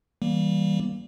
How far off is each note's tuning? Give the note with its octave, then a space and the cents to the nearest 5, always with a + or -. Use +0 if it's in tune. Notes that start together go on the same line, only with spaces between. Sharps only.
E3 -30 G3 -15 A#3 +10